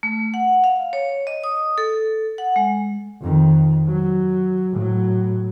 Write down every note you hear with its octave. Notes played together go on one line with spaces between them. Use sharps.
A3
F#5
F5
C#5
D#5
D#6
A4
F#5
G#3
F2 D#3
F#3
A2 F#3